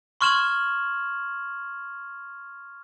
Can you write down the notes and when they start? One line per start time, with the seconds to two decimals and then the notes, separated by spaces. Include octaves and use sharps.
0.21 C6 C#6 F6 G#6 E7 F#7